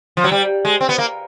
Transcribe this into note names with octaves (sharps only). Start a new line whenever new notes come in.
F3
F#3
G3
G#3
C4
B3
A#3